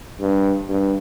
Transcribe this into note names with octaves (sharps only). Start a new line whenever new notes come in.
G2
G2